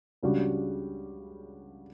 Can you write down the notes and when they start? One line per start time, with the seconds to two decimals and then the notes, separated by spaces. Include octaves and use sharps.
0.23 C#2 C#3 G3 D4 F#4